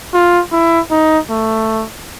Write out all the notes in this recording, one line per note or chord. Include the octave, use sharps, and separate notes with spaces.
F4
E4
D#4
A3